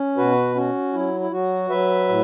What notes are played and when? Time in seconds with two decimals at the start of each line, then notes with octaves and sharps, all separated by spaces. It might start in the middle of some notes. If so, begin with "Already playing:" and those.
Already playing: C#4
0.17 B2 F#4 B4
0.55 C#4 F#4
0.93 F#3 E4
1.20 E4
1.31 F#3 F#4
1.69 F#3 B4 E5
2.09 A2